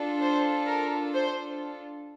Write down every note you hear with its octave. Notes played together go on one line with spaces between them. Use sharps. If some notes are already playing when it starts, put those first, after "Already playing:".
Already playing: D4 F4 A4
C5
A#4
C5